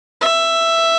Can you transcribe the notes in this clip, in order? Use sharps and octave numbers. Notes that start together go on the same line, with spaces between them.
E5